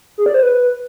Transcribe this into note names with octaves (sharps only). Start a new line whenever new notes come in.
G#4
D5
C5
B4